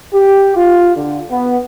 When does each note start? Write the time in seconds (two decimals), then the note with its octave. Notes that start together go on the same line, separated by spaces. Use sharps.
0.13 G4
0.56 F4
0.95 D3
1.30 B3